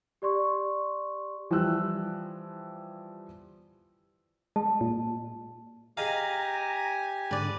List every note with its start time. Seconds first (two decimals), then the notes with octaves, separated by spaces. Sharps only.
0.22 G4 D5 C6 C#6
1.51 E3 F3 G3 E6 F#6
4.56 G#3 A5
4.81 A#2
5.97 G4 G#4 D#5 F5 G#5 A#5
7.31 G#2 D3 B4 D5